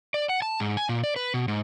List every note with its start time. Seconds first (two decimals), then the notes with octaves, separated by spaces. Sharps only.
0.14 D5
0.29 F#5
0.42 A5
0.60 G#2
0.77 G#5
0.89 A#2
1.04 D5
1.16 B4
1.34 B2
1.48 G#2